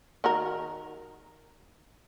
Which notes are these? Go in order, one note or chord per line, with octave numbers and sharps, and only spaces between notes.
D#3 F#4 A#4